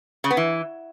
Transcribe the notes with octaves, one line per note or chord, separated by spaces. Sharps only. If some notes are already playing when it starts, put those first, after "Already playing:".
C#3
B3
E3